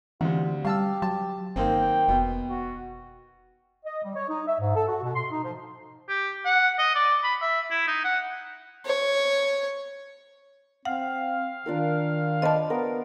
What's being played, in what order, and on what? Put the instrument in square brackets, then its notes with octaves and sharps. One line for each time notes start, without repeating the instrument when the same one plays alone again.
[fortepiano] D2 C3 [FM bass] E3 [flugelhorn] F4
[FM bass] G3 [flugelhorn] G4 [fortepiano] F5 A5 E6
[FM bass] F#3 [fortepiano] A5
[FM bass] G1 [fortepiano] D#3 A#3 C4 [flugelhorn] G5
[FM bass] F1 [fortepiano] B2
[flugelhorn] F#4
[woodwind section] D#5
G3
C#5
D#4
E5
G#2
A4
F#4
B2
C6
D#4
F3
[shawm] G4
F#5
D#5
D5
B5
E5
E4
D#4
F#5
[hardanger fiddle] C#5
[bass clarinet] C4 [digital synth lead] F5 [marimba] F#5
[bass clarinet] D#3 [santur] D4 F4 A#4
[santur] C5 D5 B5 [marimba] D#5 A5
[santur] B3 A#4 F5